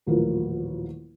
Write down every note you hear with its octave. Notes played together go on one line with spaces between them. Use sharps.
D#1 A1 F3 F#3 A#4